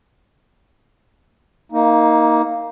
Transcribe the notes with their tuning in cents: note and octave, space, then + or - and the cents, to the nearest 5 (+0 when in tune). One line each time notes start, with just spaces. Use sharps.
A#3 +0 D#4 +15